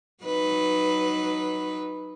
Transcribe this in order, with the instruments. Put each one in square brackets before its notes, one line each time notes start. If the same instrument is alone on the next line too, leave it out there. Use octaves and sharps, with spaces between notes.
[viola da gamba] F#3 D#4 B4